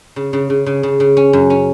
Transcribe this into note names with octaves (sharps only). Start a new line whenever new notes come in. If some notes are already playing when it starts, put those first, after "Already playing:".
C#3
C#3
C#3
C#3
C#3
C#3
C#4
F#2
C#4